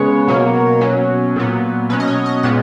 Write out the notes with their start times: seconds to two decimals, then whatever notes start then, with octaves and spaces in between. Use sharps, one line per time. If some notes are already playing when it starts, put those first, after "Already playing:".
Already playing: C#3 G#3 B3 C#5
0.28 B2 F#3 A#3
0.81 B2 F#3 C#4
1.36 A#2 F#3 B3
1.89 B2 F#3 C#4 B4
2.00 D#5
2.07 C#5
2.26 D#5
2.43 A#2 G#3 B3 F#5